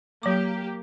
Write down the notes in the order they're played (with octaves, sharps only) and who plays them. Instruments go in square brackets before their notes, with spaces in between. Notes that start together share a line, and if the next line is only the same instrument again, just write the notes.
[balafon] F#3 D6 [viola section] A#3 G4